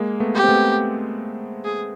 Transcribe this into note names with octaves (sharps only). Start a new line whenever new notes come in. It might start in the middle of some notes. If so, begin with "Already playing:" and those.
Already playing: G#3 A#3
A3 B3
G4
C4
A3 B3
G#4